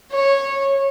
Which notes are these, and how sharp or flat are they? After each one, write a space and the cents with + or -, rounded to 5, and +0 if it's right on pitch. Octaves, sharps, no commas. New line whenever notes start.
C#5 -15